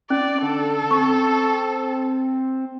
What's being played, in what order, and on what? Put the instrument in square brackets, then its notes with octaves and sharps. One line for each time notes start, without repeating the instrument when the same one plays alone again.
[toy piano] C#4 [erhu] D5
[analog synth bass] D3 [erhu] A4
[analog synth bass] C4 [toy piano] C#6